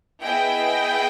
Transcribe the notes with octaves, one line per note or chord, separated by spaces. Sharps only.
B3 E4 G#4 D#5 G5